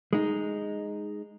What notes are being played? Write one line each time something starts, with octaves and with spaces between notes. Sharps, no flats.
G#3 D#4